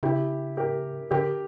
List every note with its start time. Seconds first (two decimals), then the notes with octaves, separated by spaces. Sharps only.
0.03 C#3 E4 G4
0.57 G4 A#4
1.11 D3 G4 A#4